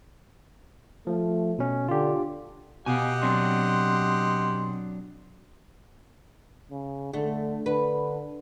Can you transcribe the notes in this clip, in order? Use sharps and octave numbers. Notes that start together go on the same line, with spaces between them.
F3 A3
B2 C#4
D3 F4 G4
B2 G4 D#5 F5 F#5 G#5
F#3 C4 D4 C6
C#3
D3 A3
D3 B4